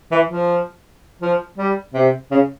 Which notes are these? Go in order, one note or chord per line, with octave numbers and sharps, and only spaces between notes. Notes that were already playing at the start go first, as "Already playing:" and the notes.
E3
F3
F3
G3
C3
C#3